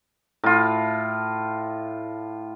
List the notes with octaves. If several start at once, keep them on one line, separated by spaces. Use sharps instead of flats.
A2 F4